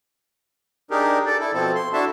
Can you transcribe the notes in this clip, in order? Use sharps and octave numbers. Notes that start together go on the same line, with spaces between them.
D4 D#4 G4 G#4 A#4
A4 D5
E4 A4
B2 F3 C4 A4
C6
D4 E4 F#4 A4 E5 A5